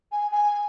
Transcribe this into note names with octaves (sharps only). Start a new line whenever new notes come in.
G#5
G#5